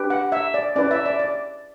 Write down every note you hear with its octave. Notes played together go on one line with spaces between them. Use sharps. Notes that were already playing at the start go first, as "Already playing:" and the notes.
Already playing: D4 G4 B4
F#5
E5
D5
C#4 E4 B4 D5
E5
D5
D5